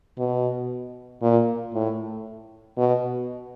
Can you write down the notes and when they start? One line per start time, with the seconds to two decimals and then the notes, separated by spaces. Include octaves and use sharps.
0.18 B2
1.22 A#2
1.74 A2
2.78 B2